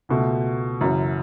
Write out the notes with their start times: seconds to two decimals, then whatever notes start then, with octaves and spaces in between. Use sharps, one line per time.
0.09 C#2 B2 A3
0.80 F#1 F#2 E3